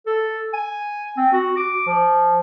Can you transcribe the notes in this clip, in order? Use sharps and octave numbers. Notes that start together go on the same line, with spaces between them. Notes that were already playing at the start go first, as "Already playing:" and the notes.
A4
G#5
C4
F#4
D6
F3